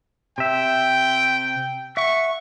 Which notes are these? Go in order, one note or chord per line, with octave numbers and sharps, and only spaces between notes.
C3 E5 G5
E5 F#5 C#6